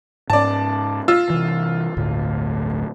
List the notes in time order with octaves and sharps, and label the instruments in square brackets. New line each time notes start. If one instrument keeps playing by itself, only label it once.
[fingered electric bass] G#2 C#4 [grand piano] D5 A5
[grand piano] F4 E6
[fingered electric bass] C3 E3
G1 D2 A2